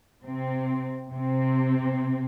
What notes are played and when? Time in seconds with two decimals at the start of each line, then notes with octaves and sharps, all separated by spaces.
0.25 C3 C4
1.11 C3 C4